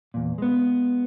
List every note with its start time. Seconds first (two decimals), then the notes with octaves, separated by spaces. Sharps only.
0.14 E2 A#2
0.38 G#3 B3